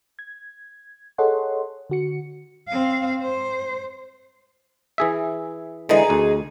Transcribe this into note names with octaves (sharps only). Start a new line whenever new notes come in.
G#6
G#4 A4 C#5 D#5 F#5 C6
D3 F#4 C#7
C4 F5
C5
E3 G#4 E5
D3 E3 G#3 D#4 G#4
D2